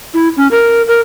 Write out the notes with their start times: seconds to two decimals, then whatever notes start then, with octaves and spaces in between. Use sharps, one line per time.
0.14 E4
0.37 C#4
0.51 A#4
0.88 A#4